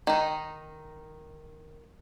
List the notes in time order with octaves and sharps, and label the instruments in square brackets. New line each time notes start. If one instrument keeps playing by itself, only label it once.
[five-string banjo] D#3 D#4